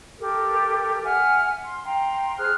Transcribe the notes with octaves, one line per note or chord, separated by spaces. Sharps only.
G4 A4 A#4
E5 F#5 G#5 F6
C6
F5 G5 A#5 C6
G#4 C5 F6 F#6